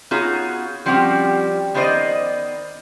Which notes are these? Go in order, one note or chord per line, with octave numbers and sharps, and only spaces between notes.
B3 D#4 F4 F#4 G#4 C#5
F3 G3 C4 C#4 F#4 G4
D#3 B3 D#4 C5 D5 D#5